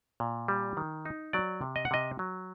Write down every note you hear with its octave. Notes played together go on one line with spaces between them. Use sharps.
A#2
G3
D#3
D#4
F#3 D5
C3
D#5
F#5
C3 D#5
F#3